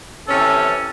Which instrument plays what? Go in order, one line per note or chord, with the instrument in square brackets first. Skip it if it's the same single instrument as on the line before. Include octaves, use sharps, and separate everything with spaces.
[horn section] C3 E3 C#4 [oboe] A4